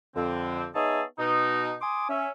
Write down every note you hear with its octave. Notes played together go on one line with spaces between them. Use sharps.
F2 D3 C4
B3 D#4 G#4 C#5 E5 A5
B2 D#4
G#5 C6 D6 D#6
C#4 E5